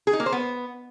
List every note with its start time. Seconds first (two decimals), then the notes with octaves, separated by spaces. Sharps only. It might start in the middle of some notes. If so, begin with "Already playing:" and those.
0.07 G#4
0.13 D#4
0.20 A#3
0.26 C5
0.32 B3